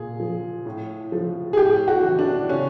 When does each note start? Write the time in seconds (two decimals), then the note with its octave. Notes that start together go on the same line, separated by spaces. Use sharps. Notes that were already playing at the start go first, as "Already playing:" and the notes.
Already playing: A#2 G#4
0.20 F3
0.66 A2
1.12 F3
1.53 G#4
1.57 A2 G4
1.88 F#4
2.03 E3
2.19 D4
2.48 C#3 C#4